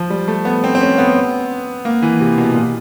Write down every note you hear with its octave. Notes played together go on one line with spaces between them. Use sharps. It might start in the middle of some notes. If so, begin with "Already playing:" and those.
Already playing: F3
G3
A3
B3
C4
C4
C#4
B3
A#3
E3
C3
B2
A#2